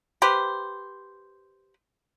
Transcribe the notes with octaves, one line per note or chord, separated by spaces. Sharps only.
G4 B4 C5